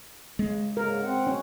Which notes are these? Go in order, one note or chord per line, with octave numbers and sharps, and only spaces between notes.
C#3 G#3
G#2 C#3 A#4
C4 F#5
C#4